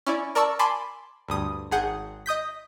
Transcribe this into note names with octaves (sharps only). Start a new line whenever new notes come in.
C#4 E4 D5
A#4 D5 A5 C#6 E6
G#5 A5 B5 C6 D6
D2 G2 D#6
G#1 G#4 F#5 G6
D#5 D#6 G6 B6